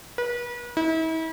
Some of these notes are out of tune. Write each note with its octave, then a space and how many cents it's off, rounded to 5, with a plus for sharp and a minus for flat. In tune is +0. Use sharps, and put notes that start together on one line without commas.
B4 -35
E4 -40